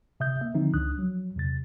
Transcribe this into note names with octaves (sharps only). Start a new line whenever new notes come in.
C3 E5 D#6 G6
A#3 E5
D3 D#3 F3 C4 D#4
C#2 D4 D#6 F#6
F3 F#3
E2 C3 A6